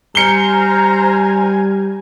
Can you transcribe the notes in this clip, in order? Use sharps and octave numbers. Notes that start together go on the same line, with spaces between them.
G3 C5 G#5 A#5 F6 C#7 G7